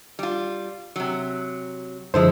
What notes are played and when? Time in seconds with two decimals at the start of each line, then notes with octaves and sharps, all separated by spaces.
0.19 G3 F4
0.96 C3 F#3
2.14 F#2 D3 F3 G#3 E4 A4 C5